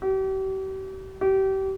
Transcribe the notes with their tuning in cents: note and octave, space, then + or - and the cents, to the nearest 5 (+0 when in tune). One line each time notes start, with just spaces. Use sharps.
G4 -40
G4 -30